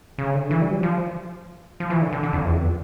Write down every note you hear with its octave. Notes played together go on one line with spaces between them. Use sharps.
C#3
D3
E3
G3
F3
F3
F3
E3
D3
D3
D3
F2
E2
F2